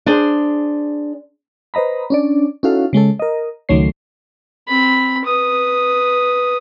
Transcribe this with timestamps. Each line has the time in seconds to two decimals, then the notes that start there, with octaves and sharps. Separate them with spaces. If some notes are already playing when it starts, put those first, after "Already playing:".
0.06 D4 G#4 C5
1.74 B4 C5 D#5 A#5 B5
2.10 C#4 D4 D5
2.63 C#4 D#4 E4 F#4 A4 F5
2.93 C#3 G#3 C#4 A4
3.19 A#4 D#5
3.69 C#2 D#3 F#3 A3 C#5 C7
4.68 C4 B5
5.25 B4 D#6